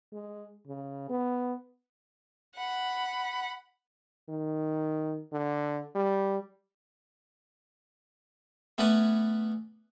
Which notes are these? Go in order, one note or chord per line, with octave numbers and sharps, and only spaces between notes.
G#3
C#3
B3
F#5 B5
D#3
D3
G3
A3 B3 C#4 B4 D5 G#5